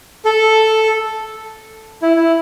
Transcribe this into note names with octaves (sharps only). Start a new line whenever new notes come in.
A4
E4
E4